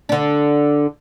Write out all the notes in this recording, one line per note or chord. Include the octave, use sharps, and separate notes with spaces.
D3 D4